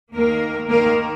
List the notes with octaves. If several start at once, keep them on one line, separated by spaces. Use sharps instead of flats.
D#2 D#3 A#3 A#4
D#2 D#3 A#3 A#4